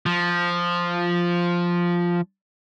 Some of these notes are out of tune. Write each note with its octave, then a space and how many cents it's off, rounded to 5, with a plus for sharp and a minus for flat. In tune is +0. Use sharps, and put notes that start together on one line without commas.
F3 +0